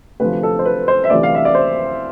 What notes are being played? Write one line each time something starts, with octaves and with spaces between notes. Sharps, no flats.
D2 C3 F3 B4
A4
C5
B4
C5
E5
D2 C3 E3 D5
F5
E5
D5
C5